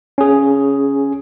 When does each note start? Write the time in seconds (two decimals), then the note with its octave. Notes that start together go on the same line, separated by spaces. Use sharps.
0.18 C#4 G#4